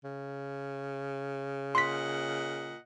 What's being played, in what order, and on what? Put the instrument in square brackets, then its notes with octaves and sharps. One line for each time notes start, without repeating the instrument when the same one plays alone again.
[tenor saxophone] C#3
[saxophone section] A#2 D#5 F#5 [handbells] C6 B6